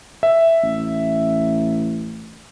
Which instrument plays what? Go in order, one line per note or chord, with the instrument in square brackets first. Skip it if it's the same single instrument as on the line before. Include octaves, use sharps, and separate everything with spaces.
[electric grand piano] E5
[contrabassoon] A1